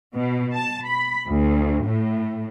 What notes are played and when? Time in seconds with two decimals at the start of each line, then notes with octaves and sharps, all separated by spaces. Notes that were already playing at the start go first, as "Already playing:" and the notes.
0.15 B2
0.55 A5
0.87 B5
1.27 D2
1.85 A2